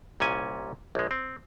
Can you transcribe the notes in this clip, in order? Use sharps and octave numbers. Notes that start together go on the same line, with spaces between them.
C2 A#2 C#4 G#5
A#1 G#3
C4